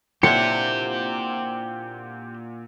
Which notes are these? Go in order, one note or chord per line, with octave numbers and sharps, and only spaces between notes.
A#2 C4 D4 E4 G4 C5 F#5 C#7